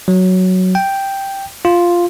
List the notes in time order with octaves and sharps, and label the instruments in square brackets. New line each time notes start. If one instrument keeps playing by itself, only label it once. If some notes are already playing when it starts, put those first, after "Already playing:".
[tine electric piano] F#3
G5
F4